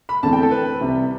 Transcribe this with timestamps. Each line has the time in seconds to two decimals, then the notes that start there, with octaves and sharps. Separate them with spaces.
0.09 B5
0.23 E2 D3 A3 C4 A5
0.33 G5
0.43 A4
0.51 B4
0.81 C2 C3 G3